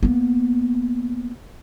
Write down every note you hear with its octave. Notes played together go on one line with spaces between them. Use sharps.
A#3 B3